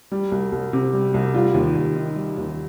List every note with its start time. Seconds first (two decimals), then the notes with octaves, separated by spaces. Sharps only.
0.12 G3
0.32 C2
0.52 C2
0.73 C3
0.93 G3
1.14 C2
1.34 G3 F4
1.54 D#2
1.76 D#2
1.96 D#3
2.16 G3
2.37 D#2